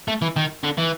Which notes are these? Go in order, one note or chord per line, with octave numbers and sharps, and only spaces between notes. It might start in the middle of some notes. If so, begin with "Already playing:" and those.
A3
E3
D#3
D3
E3